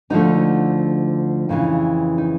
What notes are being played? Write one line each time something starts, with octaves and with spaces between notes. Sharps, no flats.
D2 D3 F3 A3 D#4
F2 C#3 E3
D#4